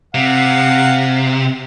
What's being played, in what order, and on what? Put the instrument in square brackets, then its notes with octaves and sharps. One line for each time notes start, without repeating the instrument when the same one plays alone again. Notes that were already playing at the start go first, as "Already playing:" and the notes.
[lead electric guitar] C3 [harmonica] F5 F#5